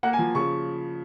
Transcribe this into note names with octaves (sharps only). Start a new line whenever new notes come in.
A#3 F#5
G#5
F3
C#3 C#6